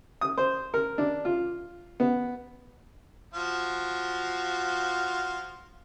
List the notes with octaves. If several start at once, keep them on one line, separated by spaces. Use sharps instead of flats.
D#6
C5
A#4
D4
F4
B3
F3 F4 F#4